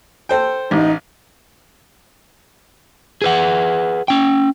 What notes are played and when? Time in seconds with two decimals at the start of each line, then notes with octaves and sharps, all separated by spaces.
0.29 A4 C5 G5
0.71 A1 D#4
3.22 G#4 B4 F#5
4.08 C#4 G5